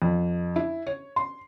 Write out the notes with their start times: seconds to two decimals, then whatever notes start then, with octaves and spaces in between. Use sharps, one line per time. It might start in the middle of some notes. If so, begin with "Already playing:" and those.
0.02 F2
0.56 E4
0.87 C#5
1.16 C6